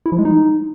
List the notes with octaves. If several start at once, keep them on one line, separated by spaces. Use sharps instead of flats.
E4
F3
G#3
D#4